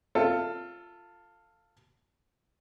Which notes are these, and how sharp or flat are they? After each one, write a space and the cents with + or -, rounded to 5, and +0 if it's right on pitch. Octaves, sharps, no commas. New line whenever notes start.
F4 +0 A4 +20 E5 +0